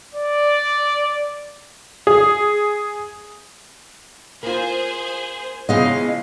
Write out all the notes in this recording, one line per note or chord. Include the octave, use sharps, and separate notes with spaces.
D5
G#4
A#3 F4 G#4 C5
C#3 E3 F3 G#3 B3 D#5 F5